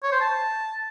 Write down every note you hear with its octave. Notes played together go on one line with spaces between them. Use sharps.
C#5
C5
A5